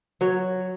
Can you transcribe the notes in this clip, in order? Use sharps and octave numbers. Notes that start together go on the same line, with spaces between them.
F#3 C#5